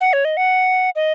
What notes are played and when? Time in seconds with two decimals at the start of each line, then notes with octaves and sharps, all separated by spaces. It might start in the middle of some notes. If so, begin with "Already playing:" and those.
0.01 F#5
0.13 C#5
0.25 D#5
0.37 F#5
0.96 D#5